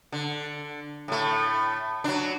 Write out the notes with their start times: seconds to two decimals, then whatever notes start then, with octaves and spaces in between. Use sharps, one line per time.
0.12 D3
1.08 A2 A3
2.04 F#3 D4